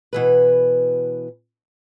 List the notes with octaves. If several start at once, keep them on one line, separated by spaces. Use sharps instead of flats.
B2 E3 B4